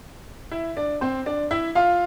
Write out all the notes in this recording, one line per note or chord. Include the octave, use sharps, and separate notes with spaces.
E4 E5
D4 D5
C4 C5
D4 D5
E4 E5
F4 F5